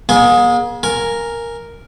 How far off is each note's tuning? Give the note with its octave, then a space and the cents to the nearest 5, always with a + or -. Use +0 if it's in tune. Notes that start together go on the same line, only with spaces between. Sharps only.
A#3 +45 G#4 +0 G#5 +0
A#4 +0 G#5 +0